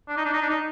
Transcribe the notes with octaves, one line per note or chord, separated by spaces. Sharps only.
D4
D#4
D4
D#4
D4
D#4